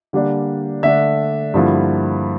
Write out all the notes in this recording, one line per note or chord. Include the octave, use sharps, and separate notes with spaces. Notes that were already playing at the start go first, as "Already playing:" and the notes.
D3 G3 A#3 D4
D3 A3 D4 E5
G2 D3 F3 A#3 E4